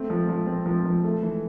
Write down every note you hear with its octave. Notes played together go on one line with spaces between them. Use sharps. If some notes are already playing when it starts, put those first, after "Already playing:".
Already playing: A3 C4
F3
F3
C4
F3
F3
A3
E3